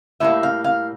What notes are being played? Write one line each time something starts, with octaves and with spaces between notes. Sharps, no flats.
A2 G3 A#3 E5
F5
F5